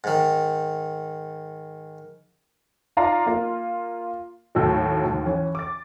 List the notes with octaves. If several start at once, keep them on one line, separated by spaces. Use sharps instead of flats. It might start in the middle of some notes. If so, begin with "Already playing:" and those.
G#2 D#3
D#4 F4 D5 F5 A#5
A#3 F4
D#2 A2 F#3
D#2 G#2
E3 C#4
D6 A6